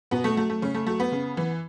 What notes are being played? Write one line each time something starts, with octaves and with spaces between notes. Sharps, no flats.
B2 B3
A3
F#3 A3
A3
C#3 C#4
A3
F#3 A3
B3
C#3
E3